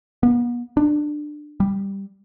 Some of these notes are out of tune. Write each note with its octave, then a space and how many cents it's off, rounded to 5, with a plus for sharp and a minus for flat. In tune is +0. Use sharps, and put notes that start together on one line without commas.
B3 -40
D4 +20
G3 +5